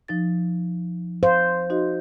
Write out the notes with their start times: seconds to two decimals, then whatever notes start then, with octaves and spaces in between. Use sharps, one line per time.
0.08 F3 D#4 A6
1.23 C5 F5
1.70 D#4 F#4 D#5